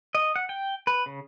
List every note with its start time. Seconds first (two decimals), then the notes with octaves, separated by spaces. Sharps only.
0.15 D#5
0.36 F#5
0.49 G5
0.87 B4
1.06 C#3